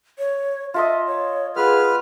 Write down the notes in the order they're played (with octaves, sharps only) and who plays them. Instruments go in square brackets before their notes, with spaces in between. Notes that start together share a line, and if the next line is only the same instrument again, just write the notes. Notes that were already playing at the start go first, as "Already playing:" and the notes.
[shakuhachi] C#5
[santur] F4 A4 D#5 [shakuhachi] E5
[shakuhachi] C#5
[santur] B3 [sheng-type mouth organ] F4 B4 F6 [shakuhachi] G#4